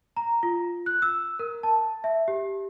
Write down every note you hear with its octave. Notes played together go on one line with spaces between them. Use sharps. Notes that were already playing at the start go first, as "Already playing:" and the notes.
A#5
F4
F#6
E6
A#4
A5
E5
G4